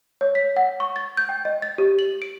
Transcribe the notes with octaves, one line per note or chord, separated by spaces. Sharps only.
C#5
B6
F#5
C#6
A6
G6
G5
D#5
A6
G4
F#7
D7